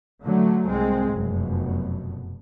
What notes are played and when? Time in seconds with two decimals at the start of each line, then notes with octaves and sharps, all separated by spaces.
0.23 D3 F#3 A3
0.69 C2 G#3 C4
1.15 F1 F#2 B2